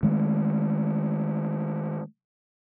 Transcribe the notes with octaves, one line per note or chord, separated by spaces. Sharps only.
D#3 G#3 A3